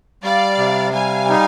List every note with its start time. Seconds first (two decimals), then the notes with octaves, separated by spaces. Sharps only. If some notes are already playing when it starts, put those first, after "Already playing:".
0.23 G3 D5 F5
0.58 C3
0.93 G3 F5 G#5
1.29 D#4